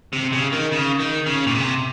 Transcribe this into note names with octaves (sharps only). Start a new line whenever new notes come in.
C3
C#3
D#3
C#3
D#3
C#3
A#2
C3